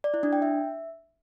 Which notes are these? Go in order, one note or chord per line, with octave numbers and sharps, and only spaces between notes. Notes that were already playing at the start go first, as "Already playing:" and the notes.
D5
E4
D4
G5
E5